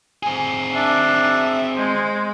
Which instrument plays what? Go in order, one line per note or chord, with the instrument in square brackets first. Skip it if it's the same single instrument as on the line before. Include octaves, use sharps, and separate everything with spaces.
[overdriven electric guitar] C4 G#4
[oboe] D4 [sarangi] E5
[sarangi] G#3 [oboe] C5